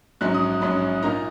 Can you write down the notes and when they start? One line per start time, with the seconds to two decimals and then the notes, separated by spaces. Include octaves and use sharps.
0.21 A#1 G#2 F#3 C#4 F#6
0.34 D#6
0.61 A#1 G#2 F#3 C#4 B5
1.02 A#2 A#3 D#4 A#5